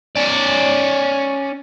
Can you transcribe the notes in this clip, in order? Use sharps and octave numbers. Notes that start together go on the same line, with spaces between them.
C#4 D5